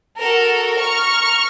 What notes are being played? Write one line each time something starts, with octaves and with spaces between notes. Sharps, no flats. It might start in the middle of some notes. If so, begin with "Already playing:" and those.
F#4 A4 A#4
A#5 C#6 F6